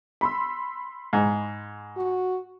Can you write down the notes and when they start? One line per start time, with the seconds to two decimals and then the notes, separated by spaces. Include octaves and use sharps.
0.21 B5 C6 E6
1.13 G#2
1.97 F#4